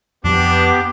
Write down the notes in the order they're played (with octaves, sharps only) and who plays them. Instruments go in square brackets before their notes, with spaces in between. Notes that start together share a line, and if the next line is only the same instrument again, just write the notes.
[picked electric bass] F2 F3 [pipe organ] B3 G4 [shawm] D4